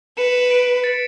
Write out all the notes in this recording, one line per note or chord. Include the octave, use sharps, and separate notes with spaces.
B4 C#7 E7
B6 D7
A6 C#7